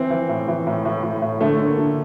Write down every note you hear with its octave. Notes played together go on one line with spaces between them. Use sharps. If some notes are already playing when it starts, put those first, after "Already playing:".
Already playing: E3 C4
E3
A2
E3
A2
A2
A2
A2
D3 A3
D3
A#3
D3